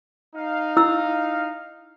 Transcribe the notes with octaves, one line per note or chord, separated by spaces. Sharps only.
D#4 F5
E4 E6